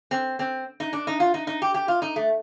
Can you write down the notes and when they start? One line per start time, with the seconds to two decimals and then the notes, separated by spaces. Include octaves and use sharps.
0.11 C4
0.39 C4
0.80 D#4
0.93 D4
1.07 D#4
1.20 F4
1.34 D#4
1.47 D#4
1.62 G4
1.74 G4
1.88 F4
2.02 D#4
2.16 A3